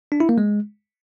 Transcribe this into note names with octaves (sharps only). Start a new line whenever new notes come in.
D4
E4
A#3
G#3